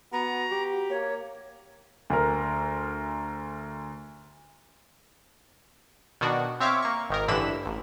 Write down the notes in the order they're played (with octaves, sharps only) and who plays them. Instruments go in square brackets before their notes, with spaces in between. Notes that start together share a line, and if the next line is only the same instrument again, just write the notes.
[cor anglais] B3 [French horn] F#4 [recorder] A#5
[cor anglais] G4
[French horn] A#3 [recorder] C#5
[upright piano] D2 A#4
[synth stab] B2 D#3 D4 F#4
C4 C#5 E5 F5 C#6 D6
A#3 C#6
G#1 D#3 A#4
A1 G2 D3 E3 B5 E7
A1